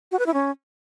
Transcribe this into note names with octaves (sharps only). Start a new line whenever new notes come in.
F#4
B4
E4
C#4